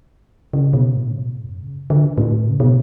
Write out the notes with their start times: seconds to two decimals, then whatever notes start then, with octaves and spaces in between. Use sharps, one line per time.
0.53 C#3
0.73 B2
0.95 A2
1.11 C#3
1.15 B2
1.35 A2
1.44 E2
1.49 F#2
1.63 C#3
1.90 D3
2.18 A2
2.49 C#3
2.60 B2